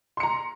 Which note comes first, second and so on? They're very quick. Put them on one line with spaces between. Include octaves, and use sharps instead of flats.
C6 C#7 A#5